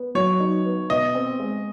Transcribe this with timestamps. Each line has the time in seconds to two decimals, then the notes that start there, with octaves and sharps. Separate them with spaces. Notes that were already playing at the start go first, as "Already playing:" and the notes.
Already playing: B3
0.15 F#3 C#5
0.40 D#4
0.65 B3
0.90 B2 D#5
1.15 C4
1.40 G#3